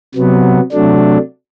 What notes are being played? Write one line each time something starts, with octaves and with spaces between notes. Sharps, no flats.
C3 F#3 B3
C3 F#3 A3 D4